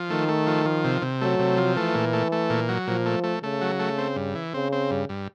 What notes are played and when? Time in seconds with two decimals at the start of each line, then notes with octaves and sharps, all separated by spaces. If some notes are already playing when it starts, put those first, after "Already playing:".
Already playing: F3
0.10 D#3 A3
0.28 A3
0.47 F3
0.66 F3
0.84 C3
1.02 C3
1.21 F#3 A3
1.39 C3
1.58 F3
1.76 E3 A3
1.95 A#2
2.13 A3
2.32 A3
2.50 A#2
2.69 F#3
2.87 A#2 F3
3.06 A3
3.24 A3
3.43 C#3 A3
3.61 F#3
3.79 A3
3.98 C4
4.16 G2
4.35 E3
4.54 C#3 C4
4.72 C4
4.91 G2
5.09 G2